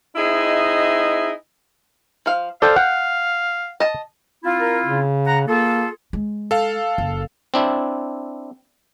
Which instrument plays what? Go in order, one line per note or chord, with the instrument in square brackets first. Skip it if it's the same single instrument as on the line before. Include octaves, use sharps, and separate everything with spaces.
[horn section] C4 D#4 E4 G#4 D#5 E5
[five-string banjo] F3 F5
[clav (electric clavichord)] A4 D5 [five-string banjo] C5 G5 [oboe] F5
[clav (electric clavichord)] F#5 [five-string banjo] G5
[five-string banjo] D#5 A5
[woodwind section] C4 E4 F4
[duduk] A#4
C#3
[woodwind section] F#5 A#5
[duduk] A#3 [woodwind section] F4 G#4 A4
[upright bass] G#3
[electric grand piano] A4 F5
[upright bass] F#1
[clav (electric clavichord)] C4 D4 E4